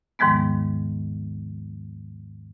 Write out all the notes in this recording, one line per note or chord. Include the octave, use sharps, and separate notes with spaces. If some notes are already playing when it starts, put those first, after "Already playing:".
D#2 G#2 D#3 F3 G#3 B3